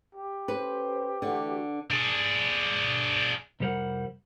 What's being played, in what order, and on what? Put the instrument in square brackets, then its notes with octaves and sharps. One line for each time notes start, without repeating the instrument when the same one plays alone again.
[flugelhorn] G4
[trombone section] C#4 A4 C5 [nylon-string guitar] B4
[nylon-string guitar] D3 [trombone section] E3 A3 F#4
[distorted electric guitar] D4 G#4
[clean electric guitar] C2 F2 G3 A#4 C5 F#5